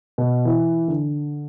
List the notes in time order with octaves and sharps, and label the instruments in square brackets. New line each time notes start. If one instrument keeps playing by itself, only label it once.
[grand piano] B2
E3
D3